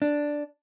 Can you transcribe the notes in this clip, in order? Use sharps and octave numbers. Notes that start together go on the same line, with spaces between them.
D4